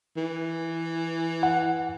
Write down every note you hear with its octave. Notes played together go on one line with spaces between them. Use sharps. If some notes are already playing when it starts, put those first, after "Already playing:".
E3
F#5